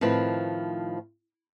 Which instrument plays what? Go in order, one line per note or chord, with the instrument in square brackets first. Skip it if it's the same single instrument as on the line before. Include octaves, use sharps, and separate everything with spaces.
[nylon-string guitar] A2 D#3 F3 C4 B4